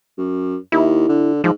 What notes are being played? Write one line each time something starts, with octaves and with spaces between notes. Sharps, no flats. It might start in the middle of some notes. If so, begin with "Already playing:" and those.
F#2
D#2 E4
D3
G#2 F3